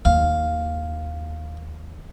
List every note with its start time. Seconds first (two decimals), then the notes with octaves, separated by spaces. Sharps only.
0.05 D#2 F5